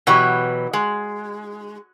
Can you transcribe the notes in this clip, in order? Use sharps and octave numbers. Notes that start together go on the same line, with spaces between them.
B2 E3 F#3 G4
G#3